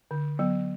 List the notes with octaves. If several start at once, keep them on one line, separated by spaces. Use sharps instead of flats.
D3
F#3 B3